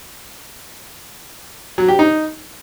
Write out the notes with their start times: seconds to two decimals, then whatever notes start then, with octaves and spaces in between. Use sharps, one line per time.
1.78 F#3
1.88 G4
1.99 D#4